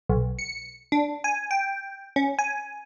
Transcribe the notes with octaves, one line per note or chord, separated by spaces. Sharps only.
B1
C#7
D4
G#5
G5
C#4
G#5